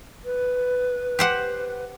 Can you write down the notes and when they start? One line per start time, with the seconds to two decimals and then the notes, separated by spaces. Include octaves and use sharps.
0.24 B4
1.19 G4 C5 F#5